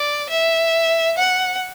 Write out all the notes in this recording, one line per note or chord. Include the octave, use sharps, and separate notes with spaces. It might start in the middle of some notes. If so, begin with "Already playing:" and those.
Already playing: D5
E5
F#5